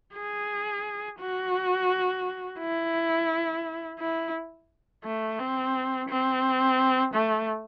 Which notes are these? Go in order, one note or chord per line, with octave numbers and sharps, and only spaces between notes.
G#4
F#4
E4
E4
A3
C4
C4
A3